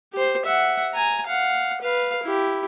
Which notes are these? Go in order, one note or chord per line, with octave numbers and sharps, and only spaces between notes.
G4 C5
E5 F#5
G#5 A#5
F5 F#5
B4 F5
E4 G4